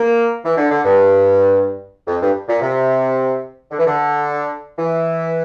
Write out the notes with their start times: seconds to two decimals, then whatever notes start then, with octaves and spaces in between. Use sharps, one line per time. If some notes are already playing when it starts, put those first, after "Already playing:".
Already playing: A#3
0.45 E3
0.57 D3
0.71 D3
0.85 G2
2.07 F2
2.21 G2
2.48 A#2
2.62 C3
3.71 D3
3.79 E3
3.87 D3
4.78 E3